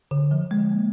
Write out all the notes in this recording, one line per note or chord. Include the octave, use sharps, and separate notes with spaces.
D3
F3
G#3
A#3